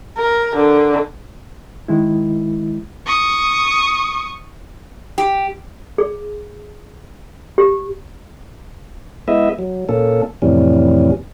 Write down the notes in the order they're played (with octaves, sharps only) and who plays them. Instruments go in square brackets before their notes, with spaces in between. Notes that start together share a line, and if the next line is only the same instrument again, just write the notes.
[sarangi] A#4
D3
[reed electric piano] D#3 G#3 E4
[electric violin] C#6 D#6
[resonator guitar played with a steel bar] G4
[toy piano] G#4
G4
[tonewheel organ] G#3 B3 E4 D#5 E5
F#3
A#2 A#3 C#4 A4
F2 A2 C3 E3 G3 C#4